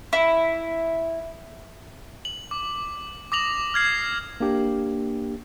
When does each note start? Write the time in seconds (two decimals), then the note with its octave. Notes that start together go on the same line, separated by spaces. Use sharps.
0.13 E4
2.25 F#7
2.51 D6
3.32 D6 D#6 A#6 F7 F#7
3.74 F6 G#6 C7
4.40 A#3 D4 G4